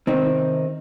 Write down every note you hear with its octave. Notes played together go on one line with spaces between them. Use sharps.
C3 D#3 C4 D#4